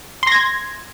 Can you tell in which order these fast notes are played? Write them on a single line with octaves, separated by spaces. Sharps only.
C6 A#6 G#6